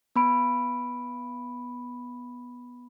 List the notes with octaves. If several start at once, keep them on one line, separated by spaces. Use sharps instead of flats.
B3 B5 D7